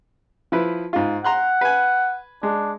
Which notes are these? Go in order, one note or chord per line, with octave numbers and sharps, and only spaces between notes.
F3 E4 B4
G#2 F4
F#5 A#5 C6 F#6
B4 G#5
G#3 D4